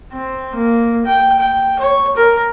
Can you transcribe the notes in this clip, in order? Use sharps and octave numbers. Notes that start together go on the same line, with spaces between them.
C4
A#3
G5
G5
C#5
A#4